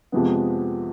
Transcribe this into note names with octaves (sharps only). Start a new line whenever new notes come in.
F2 C3 F3 G#3 B3